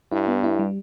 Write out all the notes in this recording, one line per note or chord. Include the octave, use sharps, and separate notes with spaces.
G2 E4
B3
E4
G3